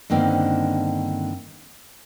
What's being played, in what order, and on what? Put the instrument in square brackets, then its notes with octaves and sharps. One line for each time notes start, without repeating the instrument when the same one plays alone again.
[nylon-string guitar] G2 D3 D#3 A#3 C4 C#4